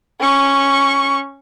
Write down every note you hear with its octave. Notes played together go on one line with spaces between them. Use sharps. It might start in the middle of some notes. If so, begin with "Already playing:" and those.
C#4 C#6